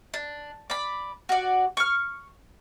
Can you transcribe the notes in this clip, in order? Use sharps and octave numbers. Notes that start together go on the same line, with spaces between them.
D4
D5 B5
F#4 D5
C#6 F6